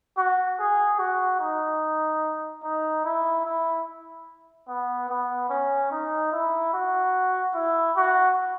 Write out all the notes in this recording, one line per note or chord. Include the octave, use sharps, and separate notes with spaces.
F#4
G#4
F#4
D#4
D#4
E4
E4
B3
B3
C#4
D#4
E4
F#4
E4
F#4